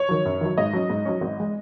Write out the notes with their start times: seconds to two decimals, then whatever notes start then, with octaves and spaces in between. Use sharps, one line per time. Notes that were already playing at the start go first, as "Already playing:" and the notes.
Already playing: C#5
0.09 D#3 F#3
0.25 F#2
0.41 D#3 F#3
0.58 G#2 D#5
0.73 F#3 C#4
0.90 G#2
1.05 F#3 C#4
1.21 G#1
1.40 G#3